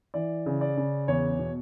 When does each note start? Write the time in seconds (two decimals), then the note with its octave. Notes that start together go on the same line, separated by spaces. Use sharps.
0.14 E3 D5
0.46 C#3
0.61 D5
0.77 C#3
1.08 E2 C#5
1.39 B2